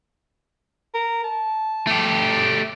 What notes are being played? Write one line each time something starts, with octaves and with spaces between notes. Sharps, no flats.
A#4
A5
A3 G4